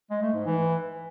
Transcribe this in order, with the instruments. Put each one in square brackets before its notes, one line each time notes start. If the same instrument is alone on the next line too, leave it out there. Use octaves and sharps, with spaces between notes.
[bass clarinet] G#3
A3
G#2
E3